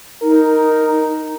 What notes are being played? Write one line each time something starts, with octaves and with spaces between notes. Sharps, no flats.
D#4 A#4